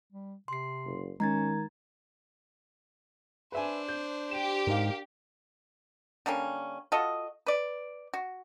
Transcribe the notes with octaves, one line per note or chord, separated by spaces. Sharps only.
G3
C3 C6 C7
F#1
D#3 G#3 C#4 A#5 G#6 A6
D4 B4 C5 E5 G#5
G6
G4 D7 E7
G#2 A#4 F5
D3 G3 A#3 C#4
F4 F#4 A4 D#5
B4 D5
F#4